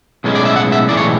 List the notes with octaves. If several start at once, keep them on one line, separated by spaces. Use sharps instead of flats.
B1 A2 G#3 C#4
D5
E5
F#5
E5
B1 A2 E3 G#3 D5
C#5